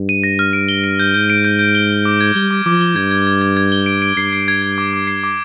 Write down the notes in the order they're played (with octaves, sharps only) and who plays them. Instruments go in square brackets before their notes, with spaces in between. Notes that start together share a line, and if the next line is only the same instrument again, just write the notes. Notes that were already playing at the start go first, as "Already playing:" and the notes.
Already playing: [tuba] G2
[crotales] D#7
A#6
F6
D7
G7
D7
G6
[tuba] G#2 [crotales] G6
[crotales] D7
G6
G6
G7
G7
D6
G#6
[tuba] G3 [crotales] G7
[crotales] D6
[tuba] F3 [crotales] D6
[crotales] G7
[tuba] G2 [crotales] G#6
[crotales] G#6
G#6
G#6
G#6
G7
D7
D7
[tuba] G2 [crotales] C7
[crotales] C7
G#6
G#6
D6
D6
C7
D6